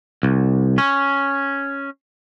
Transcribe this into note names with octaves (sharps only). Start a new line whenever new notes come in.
C2
C#4